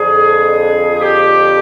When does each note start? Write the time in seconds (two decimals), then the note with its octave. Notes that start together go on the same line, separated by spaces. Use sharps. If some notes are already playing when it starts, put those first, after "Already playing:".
Already playing: F2 D3 G#4
0.95 G#4
1.01 G4